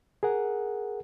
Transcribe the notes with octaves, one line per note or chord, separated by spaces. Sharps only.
G#4 A#4 F#5